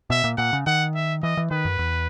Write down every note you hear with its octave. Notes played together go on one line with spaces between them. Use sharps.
B2 E5
A#2
A#2 F#5
C#3
D#3 F#5
E5
E3 D#5
E3
D#3 B4
F#2
E2